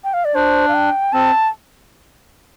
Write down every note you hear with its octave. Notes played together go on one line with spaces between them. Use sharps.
G5
F5
D5
D4 C5
F5
G5
C4 A5